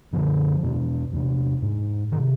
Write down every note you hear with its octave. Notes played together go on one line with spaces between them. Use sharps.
F#2 D3 F3
E2 B2
E2 C3
G#2
D#3
C3